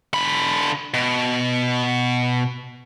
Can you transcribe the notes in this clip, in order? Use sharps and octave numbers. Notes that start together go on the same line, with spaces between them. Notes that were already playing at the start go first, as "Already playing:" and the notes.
D3 B5
B2